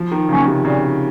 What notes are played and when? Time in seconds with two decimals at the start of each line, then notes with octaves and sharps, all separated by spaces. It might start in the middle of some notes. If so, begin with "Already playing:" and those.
Already playing: F3
0.12 D#3
0.29 C#3 F#3 A#3 C#4
0.47 C3
0.65 A#2 C#3